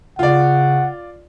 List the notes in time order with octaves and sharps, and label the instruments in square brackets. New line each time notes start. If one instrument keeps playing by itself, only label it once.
[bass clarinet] C#3 [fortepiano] F4 D5 [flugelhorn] F#5